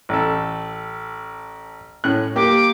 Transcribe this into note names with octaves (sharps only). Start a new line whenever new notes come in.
A1 A4
A2 C#4 F#6
A#3 G4 D6